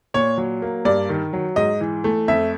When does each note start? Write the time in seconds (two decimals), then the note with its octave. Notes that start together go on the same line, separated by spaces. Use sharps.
0.14 A#2 C#5
0.37 F#3
0.62 A#3
0.85 G2 D5
1.09 D#3
1.33 F#3
1.56 G#2 D#5
1.81 E3
2.04 A3
2.28 F2 E5